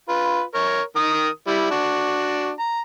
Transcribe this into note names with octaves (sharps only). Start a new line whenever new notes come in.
F4 B4
A#4 C#5
D#3 A#4 D#6
G3 E4
D4 F#4
A#5